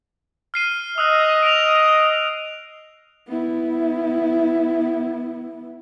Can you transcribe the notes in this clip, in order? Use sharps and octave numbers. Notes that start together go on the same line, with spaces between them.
F6 C7 D#7
D#5 D#6 E6 F#6
D7 F7
B3 E4